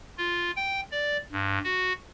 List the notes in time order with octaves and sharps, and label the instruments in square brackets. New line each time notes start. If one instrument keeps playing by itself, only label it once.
[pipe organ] F4
G5
D5
G2
F#4